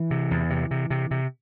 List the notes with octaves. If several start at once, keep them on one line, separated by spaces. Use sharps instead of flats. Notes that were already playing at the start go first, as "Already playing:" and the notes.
Already playing: E3
C3
E2
C3
C3
C3
C3